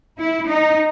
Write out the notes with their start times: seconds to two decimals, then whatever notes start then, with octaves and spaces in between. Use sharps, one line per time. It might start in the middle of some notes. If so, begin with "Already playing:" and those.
0.18 E4
0.47 D#4